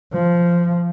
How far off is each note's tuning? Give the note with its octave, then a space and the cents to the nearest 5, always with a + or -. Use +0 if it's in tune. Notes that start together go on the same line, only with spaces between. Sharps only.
F3 -10